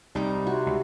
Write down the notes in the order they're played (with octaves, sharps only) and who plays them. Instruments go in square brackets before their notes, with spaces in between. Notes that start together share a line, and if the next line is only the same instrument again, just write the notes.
[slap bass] C2 [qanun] G3 D#4 D6
[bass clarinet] C3 [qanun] F#4
[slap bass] C#2